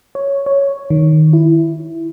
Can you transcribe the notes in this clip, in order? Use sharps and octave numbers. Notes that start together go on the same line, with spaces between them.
C#5
C#5
D#3
E4